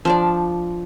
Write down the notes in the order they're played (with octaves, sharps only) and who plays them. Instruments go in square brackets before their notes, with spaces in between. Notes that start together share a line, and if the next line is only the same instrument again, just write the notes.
[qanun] F3 D4 D5